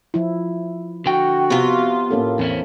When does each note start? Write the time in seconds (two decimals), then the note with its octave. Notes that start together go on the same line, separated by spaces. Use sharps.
0.14 F3 E4
1.06 D3 F#4 G5
1.50 C3 B3 F4
2.11 A2 A#3 C#4 A4
2.39 E2 C4 C#4 E4